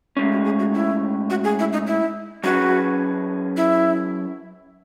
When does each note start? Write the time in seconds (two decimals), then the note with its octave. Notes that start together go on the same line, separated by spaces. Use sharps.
0.17 A2 G#3 C#4
0.32 F#4
0.45 G#4
0.59 F#4
0.74 E4
1.30 F#4
1.44 G#4
1.59 E4
1.73 D#4
1.87 E4
2.44 F#3 C#4 F#4 G#4 B4
3.57 E4